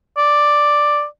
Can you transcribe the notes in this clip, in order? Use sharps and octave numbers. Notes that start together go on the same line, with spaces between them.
D5